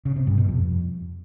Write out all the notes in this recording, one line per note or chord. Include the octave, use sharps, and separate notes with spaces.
C#3
C3
G2
B2
F2